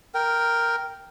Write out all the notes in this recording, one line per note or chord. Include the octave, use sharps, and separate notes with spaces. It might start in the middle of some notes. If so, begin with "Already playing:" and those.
A#4 G5